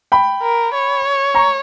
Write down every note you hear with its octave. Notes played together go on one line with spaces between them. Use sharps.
G5 B5
A#4
C#5
A#5 C#6